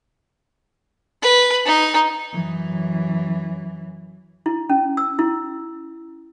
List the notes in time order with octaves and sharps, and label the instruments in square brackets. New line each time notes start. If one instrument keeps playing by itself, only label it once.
[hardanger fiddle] B4
D#4
[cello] F#2 E3
[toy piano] E4
C#4
E6
E4